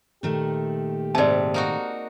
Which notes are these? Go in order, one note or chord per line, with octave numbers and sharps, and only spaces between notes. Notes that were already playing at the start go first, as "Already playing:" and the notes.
A#2 D#3 A3 G4
G#2 C3 D5 A5
A#3 D#4 F#4